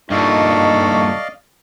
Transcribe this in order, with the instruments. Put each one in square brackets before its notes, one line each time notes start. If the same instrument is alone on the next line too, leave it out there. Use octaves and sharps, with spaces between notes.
[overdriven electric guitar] G2 A#2 [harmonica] A3 C#6 [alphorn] D#4 [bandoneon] D5 D#5 F5